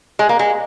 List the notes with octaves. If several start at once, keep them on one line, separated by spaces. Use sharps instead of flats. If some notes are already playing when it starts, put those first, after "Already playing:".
G#3
A#3
G#3